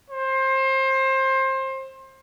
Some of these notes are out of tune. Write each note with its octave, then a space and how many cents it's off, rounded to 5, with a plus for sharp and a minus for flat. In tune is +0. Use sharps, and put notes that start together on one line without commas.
C5 +25